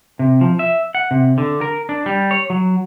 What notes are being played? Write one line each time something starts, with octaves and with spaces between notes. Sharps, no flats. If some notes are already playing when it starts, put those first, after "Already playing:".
C3
F3
E5
F#5
C3
D3
A#4
D4
G3
C#5
F#3